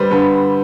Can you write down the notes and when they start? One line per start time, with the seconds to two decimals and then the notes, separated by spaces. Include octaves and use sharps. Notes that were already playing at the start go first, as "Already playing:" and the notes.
Already playing: D3 G3 B4 C5
0.11 D3 B4